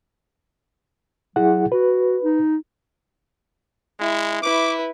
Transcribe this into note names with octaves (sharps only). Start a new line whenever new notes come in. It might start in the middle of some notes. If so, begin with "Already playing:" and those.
F#3 E4 G#4 F#5
F#4 B4
D#4
G#3 E4
E4 B4 D6